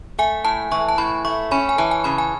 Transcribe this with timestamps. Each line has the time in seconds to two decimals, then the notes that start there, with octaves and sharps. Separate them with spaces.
0.19 A3 G#5
0.45 A2 A5
0.71 E3 C#6
0.89 A5
0.98 A2 B5
1.25 A3 C#6
1.51 C#4 B5
1.69 G#5
1.78 E3 A5
1.91 G#5
2.04 C#3 B5
2.18 G#5